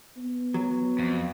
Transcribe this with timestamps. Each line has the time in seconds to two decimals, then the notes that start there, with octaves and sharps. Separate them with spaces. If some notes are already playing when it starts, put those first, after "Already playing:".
0.17 B3
0.54 F#3
0.99 F2